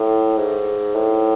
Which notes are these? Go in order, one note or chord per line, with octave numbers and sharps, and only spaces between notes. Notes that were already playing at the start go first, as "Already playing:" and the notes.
Already playing: A2
G#2
A2